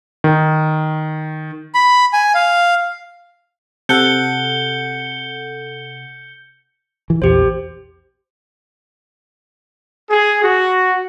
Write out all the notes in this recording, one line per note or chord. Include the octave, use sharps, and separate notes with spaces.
D#3
B5
G#5
F5
C3 A4 F#5 G6 C#7 G7
E3
A#1 E2 G4 C5
G#4
F#4